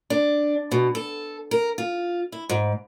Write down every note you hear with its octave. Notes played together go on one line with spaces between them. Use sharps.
D4
B2
A4
A#4
F4
E4
G#2